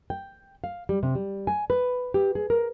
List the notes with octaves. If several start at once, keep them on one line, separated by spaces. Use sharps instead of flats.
G5
F5
G3
C3
G3
G#5
B4
G4
G#4
A#4